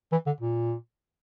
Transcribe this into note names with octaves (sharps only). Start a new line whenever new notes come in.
E3
D3
A#2